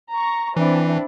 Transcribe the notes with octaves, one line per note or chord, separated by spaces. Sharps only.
A#5 C#6
E3 C4 D4 E4